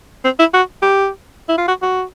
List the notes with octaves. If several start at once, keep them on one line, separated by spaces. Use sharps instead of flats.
C4
E4
F#4
G4
E4
F4
F#4
F#4